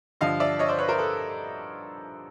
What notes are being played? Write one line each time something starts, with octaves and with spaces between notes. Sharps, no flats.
G2 D3 F3 D#5 F5
D5 E5
C#5 D#5
C5 D5
B4 C#5
A#4 C5
A4 B4